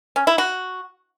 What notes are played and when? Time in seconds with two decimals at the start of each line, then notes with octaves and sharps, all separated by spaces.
0.16 C#4
0.27 E4
0.38 F#4